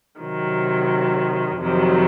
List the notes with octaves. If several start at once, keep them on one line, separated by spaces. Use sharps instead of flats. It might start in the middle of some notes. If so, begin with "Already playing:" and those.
C3 D#3 F#3
F2 C3 D#3 F#3